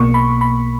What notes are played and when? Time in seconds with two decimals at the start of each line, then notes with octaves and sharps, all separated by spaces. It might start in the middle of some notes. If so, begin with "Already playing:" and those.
Already playing: B1 B2 A#3 C#6
0.14 B5
0.41 B5